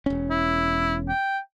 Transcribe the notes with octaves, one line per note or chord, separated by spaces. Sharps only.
E1 C#4
E4
G5